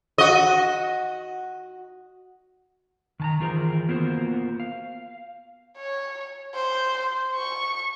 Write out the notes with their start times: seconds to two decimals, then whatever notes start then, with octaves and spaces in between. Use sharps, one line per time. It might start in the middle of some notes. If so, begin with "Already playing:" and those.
0.18 F#4 D#5
3.20 D#3 A5 A#5
3.40 D#3 E3 F4 G#4 A#4 C5
3.89 A#3 B3 F4 F#4 A#4 C5
4.60 F5
5.77 C#5
6.55 C5
7.35 C#6